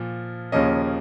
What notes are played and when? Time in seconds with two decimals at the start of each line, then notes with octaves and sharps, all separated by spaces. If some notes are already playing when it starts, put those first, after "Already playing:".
Already playing: A#2 F3
0.52 D#2 C#3 F3 A#3 C#4 D#5